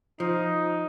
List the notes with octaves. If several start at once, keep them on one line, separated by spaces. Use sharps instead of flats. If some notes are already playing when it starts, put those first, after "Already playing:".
F3 D#4